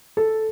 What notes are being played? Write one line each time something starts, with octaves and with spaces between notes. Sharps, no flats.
A4